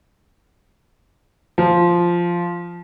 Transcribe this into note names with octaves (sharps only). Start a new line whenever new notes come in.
F3